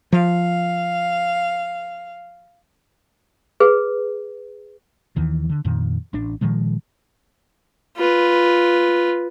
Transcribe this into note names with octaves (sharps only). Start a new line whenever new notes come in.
F3 F5
G#4 B4
D#2 D#3 E3
D3
F2 A#2 D#3
A1 D4
A#2 D#3 F3 G#3
F4 B4